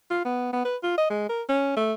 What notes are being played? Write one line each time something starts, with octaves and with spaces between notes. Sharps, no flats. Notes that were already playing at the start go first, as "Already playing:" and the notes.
F4
B3
B3
B4
F4
D#5
G#3
A#4
C#4
A3